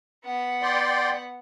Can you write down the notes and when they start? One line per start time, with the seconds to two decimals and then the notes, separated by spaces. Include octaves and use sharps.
0.24 B3 F#5
0.62 D5 G5 C6